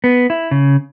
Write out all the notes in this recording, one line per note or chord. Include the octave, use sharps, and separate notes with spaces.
B3
E4
C#3